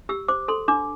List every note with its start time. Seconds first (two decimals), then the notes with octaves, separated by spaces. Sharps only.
0.09 G4 E6
0.28 C5 D6
0.48 A4 C6
0.68 D4 D6